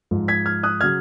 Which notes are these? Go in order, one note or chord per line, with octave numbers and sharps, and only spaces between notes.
G#2 F3
G#6 B6
F6 G#6
D#6 F#6
C#3 F#3 F6 G#6